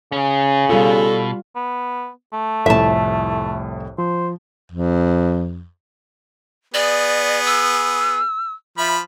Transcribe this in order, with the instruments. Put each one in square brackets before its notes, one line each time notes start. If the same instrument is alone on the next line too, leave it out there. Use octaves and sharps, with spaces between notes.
[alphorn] C#3 [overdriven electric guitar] C#4 G#4
[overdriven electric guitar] B2 [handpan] G3 F4 [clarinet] A4
[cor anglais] B3
A3
[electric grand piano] C2 F2 A2 [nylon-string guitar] E5 A5
[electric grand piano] F3 [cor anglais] C5
[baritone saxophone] F2
[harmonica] B3 G#4 [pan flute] D5
[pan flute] E6
[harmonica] F3 B5 [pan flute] E5